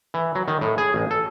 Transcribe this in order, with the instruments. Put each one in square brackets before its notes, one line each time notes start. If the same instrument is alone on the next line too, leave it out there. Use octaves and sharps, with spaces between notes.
[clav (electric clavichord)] E3
F#3
D#3
A2
G#4
A1
A4